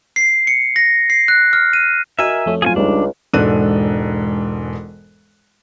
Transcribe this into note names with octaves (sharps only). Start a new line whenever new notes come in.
C7
C#7
A#6
C7
F#6
F6
D#7
F#4 A#4 D#5 E5 G#5 E6
F2 A3 C#4
F#3 C4 F4 G#4 G#5
C#2 G3 G#3 D4 D#4
E1 G#2 D4 A4 F#6 D#7